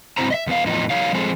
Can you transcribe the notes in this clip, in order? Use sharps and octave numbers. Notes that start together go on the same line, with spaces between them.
G#2 F#3 C4 E4 C5 A#5
D#5 E5
E2 B3 F5
E2 A2 F3 D#4
F#3 D#4 C#5 F5
F3 G#3 C4 G#4 A4